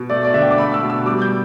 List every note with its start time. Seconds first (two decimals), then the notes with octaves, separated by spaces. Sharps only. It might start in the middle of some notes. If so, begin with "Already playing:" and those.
Already playing: B2
0.10 A3 D5
0.25 D5
0.34 D3 E5
0.42 G5
0.51 D6
0.57 A3 B5
0.74 E6
0.82 B2
0.90 E6
1.06 G3 D6
1.22 G6